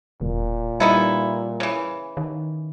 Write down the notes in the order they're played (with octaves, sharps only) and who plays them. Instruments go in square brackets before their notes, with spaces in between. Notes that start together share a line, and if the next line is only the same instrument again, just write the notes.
[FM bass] E1 [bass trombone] A#2
[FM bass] G3 [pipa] B3 D#4 E4
[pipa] C#3 E3
[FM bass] D#3